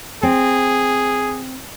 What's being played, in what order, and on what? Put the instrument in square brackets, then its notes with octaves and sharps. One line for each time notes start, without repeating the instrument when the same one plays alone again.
[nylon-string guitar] C4 [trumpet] G#4